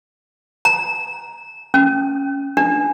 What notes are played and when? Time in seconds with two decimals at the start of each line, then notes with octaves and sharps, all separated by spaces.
0.65 A#5
1.74 C#4
2.57 D4